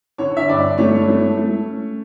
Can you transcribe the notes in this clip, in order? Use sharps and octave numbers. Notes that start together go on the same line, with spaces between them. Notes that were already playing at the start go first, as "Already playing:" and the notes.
D3 C#5
E5
G2 D5
A3 C#5
A3
A3
C#4